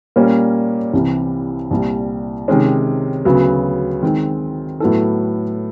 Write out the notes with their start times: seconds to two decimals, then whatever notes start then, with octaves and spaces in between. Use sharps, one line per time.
0.16 A#2 G3 A#3 C#4
0.93 C2 C3 E3
1.71 C2 A#2 G3
2.48 C3 D#3 G#3 C#4
3.25 D2 C#3 F#3 B3
4.03 D#3 G#3 C4
4.80 A2 F#3 B3 E4 A4